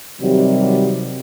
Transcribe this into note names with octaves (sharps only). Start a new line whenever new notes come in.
C3 D#3 F#3 G3